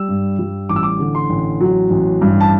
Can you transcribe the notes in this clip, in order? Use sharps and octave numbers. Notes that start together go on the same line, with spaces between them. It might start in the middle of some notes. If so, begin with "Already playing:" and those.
Already playing: G3 E6
G2
G3
A1 D6
E6
D6
D3
C6
A1
F#3
A1
G2
A5